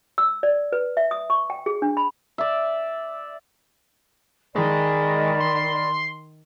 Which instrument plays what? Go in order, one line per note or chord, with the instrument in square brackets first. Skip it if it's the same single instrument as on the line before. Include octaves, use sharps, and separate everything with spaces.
[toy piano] E6
D5
B4
E5
D#6
C#6
G5
G#4
D4
B5
[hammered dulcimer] D5 E5
[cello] D#3 [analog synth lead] G#3 [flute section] A#4 D5 B5
[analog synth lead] C6